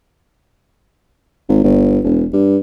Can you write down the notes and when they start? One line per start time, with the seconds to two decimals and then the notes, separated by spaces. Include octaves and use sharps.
1.49 G#1
1.64 G1
2.04 E1
2.33 G2